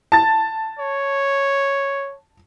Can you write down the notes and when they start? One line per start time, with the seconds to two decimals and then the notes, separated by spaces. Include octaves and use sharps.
0.12 A5 A6
0.79 C#5